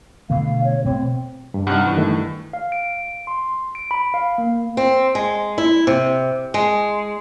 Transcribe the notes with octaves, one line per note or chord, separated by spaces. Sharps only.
B2 D3 A3 F5
C#5
B2 A3 C4
G2
G2 C3 D#4 F#5 F6 F#6
G2 E3
D#3 A3
F5
D7
C6
D7
B5
F5
A#3
C4
G#3
E4
C3
G#3